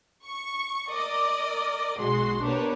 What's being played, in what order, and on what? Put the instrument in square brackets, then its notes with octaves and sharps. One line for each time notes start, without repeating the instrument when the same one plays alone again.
[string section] C#6
A#4 D5 D#5
B1 G#3 F#4 C6
B3 D4 G4 A#4 B4 C#5